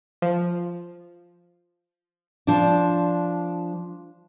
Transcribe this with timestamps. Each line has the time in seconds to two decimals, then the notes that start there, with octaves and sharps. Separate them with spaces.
0.22 F3
2.47 F3 D4